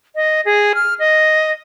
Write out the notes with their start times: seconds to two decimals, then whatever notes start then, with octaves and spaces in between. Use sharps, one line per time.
0.15 D#5
0.45 G#4
0.75 F6
0.99 D#5